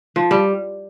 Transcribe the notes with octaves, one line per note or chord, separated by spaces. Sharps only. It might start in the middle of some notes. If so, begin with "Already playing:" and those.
F3
G3